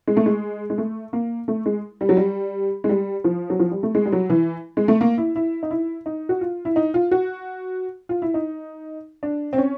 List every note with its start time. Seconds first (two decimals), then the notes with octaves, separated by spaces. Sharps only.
0.07 G#3
0.17 A3
0.26 G#3
0.70 G#3
0.78 A3
1.13 A#3
1.48 A3
1.66 G#3
2.01 G3
2.09 F#3
2.17 G3
2.84 G#3
2.89 G3
3.24 F3
3.50 F#3
3.59 F3
3.71 G3
3.83 A3
3.95 G#3
4.05 G3
4.13 F#3
4.30 E3
4.77 G#3
4.88 A3
5.01 A#3
5.18 E4
5.36 E4
5.63 D#4
5.71 E4
6.06 D#4
6.29 F#4
6.41 F4
6.65 E4
6.76 D#4
6.94 F4
7.11 F#4
8.09 F4
8.22 E4
8.34 D#4
9.23 D4
9.53 C4
9.58 C#4